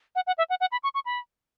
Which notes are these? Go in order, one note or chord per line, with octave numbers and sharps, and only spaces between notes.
F#5
F#5
E5
F#5
F#5
B5
C#6
C#6
B5